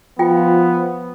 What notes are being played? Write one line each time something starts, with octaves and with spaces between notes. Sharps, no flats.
F3 B3 F4 G5